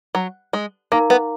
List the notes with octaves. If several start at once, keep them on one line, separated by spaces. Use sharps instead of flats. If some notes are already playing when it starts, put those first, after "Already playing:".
F#3
G#3
A#3 D#4 A#4 F5 A#5 D6
B3